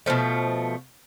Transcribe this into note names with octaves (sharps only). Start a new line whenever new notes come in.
B2 D3 F3 A3